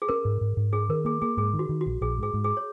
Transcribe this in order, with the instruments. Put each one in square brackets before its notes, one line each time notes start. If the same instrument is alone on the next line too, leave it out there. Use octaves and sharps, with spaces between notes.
[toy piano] G#4
[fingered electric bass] C#4 [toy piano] A#4
[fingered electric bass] G#2
G#2
G#2
[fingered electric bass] C#4 [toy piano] G#4
[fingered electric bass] D#3 [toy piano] A#4
[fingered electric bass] A#3 [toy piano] G#4
[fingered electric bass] A#3 [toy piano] G#4
[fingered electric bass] G#2 [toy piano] G#4
[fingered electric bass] D#3
[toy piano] F#4
[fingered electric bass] D#3
[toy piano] F#4
[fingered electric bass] A#1
[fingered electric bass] A#1 [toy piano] G#4
[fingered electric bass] G#2
[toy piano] G#4
[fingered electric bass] G#2
[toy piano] G#4
C#5